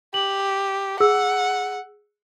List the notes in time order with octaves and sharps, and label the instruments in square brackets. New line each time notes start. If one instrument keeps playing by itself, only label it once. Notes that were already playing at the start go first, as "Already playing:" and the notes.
[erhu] G4 [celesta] F#7
[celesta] G#4 E6 [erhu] F#5